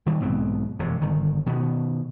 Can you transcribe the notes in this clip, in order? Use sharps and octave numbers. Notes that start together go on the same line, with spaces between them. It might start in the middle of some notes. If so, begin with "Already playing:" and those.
D#3 G3
B1 G#2 B3 C4
E1 F#2 C3
G1 D#3
B2 D#3 B3